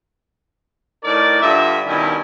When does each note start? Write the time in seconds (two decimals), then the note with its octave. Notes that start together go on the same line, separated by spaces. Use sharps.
1.03 A2 D#4 A#4 D5
1.42 G2 D3 F4 E5
1.86 G2 B2 D#3 C#4 E4